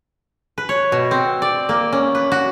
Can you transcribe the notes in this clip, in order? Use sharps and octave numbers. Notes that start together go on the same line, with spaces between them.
B4
C#5
B2
C4
D5
A#3
C#4
B4
F#4